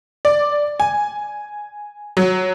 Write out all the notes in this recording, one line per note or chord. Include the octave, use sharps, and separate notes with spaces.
D5
G#5
F#3